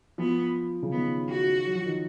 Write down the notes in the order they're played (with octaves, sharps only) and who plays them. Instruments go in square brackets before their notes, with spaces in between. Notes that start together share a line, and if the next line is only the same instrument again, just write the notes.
[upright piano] F3 [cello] B3
[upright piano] C#3
[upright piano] D#3 [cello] B3
[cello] F#4
[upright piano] F#3
F3
D#3